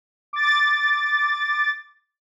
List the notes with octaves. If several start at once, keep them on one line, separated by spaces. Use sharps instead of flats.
D6 A6